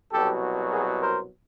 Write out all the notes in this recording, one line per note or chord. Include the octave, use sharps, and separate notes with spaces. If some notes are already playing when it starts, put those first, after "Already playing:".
C2 B2 F#3 G4 A4
G#4 A#4
A#4 C5